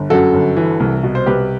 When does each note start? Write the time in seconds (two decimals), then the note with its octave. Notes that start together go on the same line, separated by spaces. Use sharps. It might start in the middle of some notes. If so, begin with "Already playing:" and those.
Already playing: G1
0.10 F#2 F#4 A4
0.34 G1
0.57 E3
0.80 C2
1.03 B2
1.15 C5
1.26 C2 G4 B4